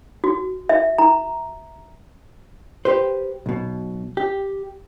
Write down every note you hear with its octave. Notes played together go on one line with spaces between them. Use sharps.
F#4
E5
A#5
G4 B4 C5
B1 B2
G4